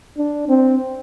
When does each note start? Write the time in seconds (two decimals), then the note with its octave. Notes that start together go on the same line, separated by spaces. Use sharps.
0.17 D4
0.49 C4